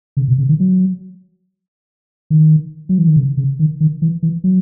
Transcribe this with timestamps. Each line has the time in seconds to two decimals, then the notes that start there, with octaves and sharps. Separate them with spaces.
0.17 C#3
0.28 B2
0.38 C#3
0.49 D#3
0.60 F#3
2.30 D#3
2.89 F#3
2.98 E3
3.07 D#3
3.16 C#3
3.37 C#3
3.59 D#3
3.81 D#3
4.02 E3
4.23 E3
4.44 F#3